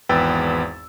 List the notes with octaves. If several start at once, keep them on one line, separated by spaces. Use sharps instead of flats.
G#1 E2 B4 G5 E6 A6